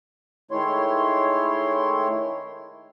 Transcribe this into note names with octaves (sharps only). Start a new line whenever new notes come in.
D#3 G#3 A3 E4 C#5 C6